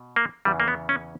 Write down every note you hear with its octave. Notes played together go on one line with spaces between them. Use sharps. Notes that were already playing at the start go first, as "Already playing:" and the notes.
Already playing: B2
A#3
E2 C#3 E3 G3
A#3
B3
C#4